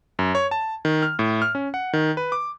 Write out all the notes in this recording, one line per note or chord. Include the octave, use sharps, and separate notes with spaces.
F#2
C#5
A5
D#3
F6
A2
F6
C#4
F#5
D#3
B4
D6